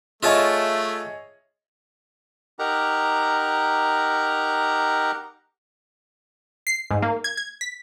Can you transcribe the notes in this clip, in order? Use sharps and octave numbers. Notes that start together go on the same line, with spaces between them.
A3 F4 G#4 C#5 D#5 E5 A5
D#4 G4 A#4 F#5 A#5
C7
G#2
A#3
G#6
G#6
B6